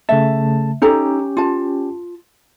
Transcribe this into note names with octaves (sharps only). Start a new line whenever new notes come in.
C#3 A3 E5 A5
C#4 D#4 G4 A4 A#5
F4 A5